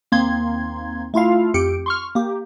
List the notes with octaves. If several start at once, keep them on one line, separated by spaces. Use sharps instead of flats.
D#2 A#3 C4 C6 G#6
A3 E4 F4 F5
F2 G4 C#7 D7
C6 C#6 F6
A#3 G4